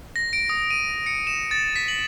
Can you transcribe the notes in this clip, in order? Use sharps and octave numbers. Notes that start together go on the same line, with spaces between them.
A#6
D7
D#6
D#7
C#7
E7
A6
B6
F#7